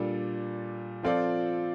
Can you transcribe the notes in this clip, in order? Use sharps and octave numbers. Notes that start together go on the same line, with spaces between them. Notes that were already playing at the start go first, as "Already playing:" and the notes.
Already playing: A#2 G3 D4 A4
F3 C4 F4 A4 D5